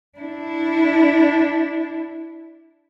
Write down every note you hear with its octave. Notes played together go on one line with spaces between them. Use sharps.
D4 E4